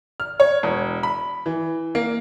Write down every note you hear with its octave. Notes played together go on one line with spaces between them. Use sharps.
F6
C#5
E1
B5
E3
A#3